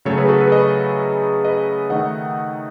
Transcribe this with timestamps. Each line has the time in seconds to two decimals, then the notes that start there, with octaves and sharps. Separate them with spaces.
0.05 C#3 F#3 A3 A4 C#5
0.18 G#4 B4
0.29 F#4 A4
0.40 G#4 B4
0.52 B4 D#5
1.45 B4 D#5
1.90 D#3 A3 D#5 F#5